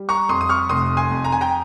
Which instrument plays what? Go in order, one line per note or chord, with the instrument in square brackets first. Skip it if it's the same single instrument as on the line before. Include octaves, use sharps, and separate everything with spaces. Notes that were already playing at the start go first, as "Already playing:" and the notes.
Already playing: [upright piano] G3
A#5 C#6
F2 C6 D#6
D#6
C#6 F6
F1 C6 D#6
G#5 C6
F2
A#5
G#5
G5 A#5